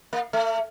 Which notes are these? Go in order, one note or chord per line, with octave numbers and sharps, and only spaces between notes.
A#3
A3